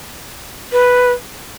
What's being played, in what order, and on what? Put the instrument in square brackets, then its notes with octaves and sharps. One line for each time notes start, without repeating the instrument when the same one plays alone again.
[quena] B4